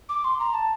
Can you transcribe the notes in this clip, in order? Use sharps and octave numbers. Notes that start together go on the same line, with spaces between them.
D6
C6
A#5
A5